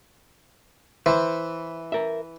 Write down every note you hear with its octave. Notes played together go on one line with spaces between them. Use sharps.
E3 C5
A#4 E5